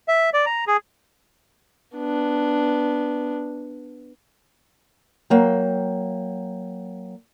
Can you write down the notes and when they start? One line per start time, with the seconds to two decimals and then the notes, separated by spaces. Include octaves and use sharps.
0.08 E5
0.34 D5
0.46 A#5
0.67 G#4
1.96 B3 D4
5.30 F#3 A#3 G5